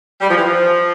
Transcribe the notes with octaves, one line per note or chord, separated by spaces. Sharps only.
G3
F3
E3
F3